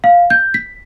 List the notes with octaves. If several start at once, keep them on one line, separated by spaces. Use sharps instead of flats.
F5
G6
B6